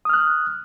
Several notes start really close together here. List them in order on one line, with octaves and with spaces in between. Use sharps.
D#6 F6 F#6